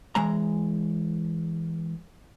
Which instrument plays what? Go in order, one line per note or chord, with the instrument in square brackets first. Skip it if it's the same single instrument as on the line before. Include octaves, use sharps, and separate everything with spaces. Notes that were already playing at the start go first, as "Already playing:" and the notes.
[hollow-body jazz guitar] E3 G#3 A#5